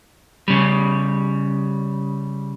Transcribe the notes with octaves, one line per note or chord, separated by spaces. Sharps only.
C#3 G3